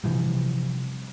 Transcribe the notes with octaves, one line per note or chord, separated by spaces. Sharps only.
C3 E3 F3 G3